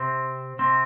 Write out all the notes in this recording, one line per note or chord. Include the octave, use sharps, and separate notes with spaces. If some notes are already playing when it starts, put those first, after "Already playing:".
Already playing: C3 C4
C3 C4